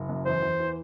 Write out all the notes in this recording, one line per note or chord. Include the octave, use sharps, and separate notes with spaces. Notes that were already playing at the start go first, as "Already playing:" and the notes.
Already playing: F#1
F#2
E2 C5
E2
E3